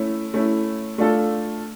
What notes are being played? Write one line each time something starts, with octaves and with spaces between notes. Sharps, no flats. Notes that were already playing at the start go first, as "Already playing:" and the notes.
Already playing: A3 C#4 E4
A3 C#4 E4
A3 D4 F4 A4